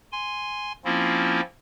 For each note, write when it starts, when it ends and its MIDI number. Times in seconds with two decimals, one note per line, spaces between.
0.12 0.72 80
0.12 0.72 84
0.85 1.41 53
0.85 1.41 58
0.85 1.41 60
0.85 1.41 61
0.85 1.41 64
0.85 1.41 65